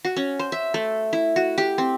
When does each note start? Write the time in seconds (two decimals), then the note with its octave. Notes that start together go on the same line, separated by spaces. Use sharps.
0.05 F#4
0.17 C#4
0.39 C5
0.52 E5
0.74 A3
1.13 E4
1.36 F#4
1.58 G4
1.78 C4